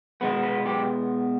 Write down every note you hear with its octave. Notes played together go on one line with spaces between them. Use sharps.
B2 G#3 B3 B4
B4
G4